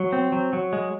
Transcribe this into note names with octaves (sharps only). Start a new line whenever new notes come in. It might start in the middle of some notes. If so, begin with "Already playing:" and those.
Already playing: F#3
C4
F#3
F#3
G#3